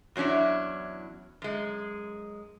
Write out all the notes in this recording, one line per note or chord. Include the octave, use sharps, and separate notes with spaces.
E2 F#3 C#4 D4 E4
F#2 G#3